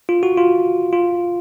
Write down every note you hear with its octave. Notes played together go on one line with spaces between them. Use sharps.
F4
F#4
F4
F4